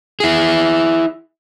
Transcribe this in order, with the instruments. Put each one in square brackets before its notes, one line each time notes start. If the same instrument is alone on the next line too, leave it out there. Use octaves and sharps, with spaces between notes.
[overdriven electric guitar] E4 G#4